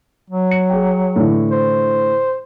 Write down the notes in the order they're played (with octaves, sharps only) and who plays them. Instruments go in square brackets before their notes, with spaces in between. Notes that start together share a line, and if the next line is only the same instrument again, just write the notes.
[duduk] F#3
[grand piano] C#7
G#4 G5
A2 D3 E3
[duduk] C5